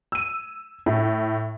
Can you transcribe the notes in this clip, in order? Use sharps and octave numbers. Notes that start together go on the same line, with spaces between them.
E6 D#7
A2